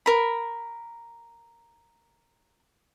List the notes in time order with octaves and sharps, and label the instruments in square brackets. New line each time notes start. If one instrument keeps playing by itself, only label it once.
[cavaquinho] A#4 B5